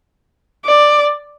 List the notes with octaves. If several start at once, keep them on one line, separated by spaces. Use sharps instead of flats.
D5